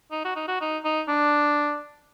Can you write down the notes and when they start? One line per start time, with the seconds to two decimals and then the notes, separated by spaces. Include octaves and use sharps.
0.11 D#4
0.25 F#4
0.36 D#4
0.48 F#4
0.61 D#4
0.84 D#4
1.08 D4